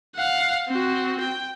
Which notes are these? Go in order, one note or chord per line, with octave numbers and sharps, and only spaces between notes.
F5 F#5
C4 F#4
G5